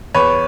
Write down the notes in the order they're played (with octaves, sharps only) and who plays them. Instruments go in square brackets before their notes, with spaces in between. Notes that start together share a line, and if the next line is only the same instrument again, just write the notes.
[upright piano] E2 B4 C#5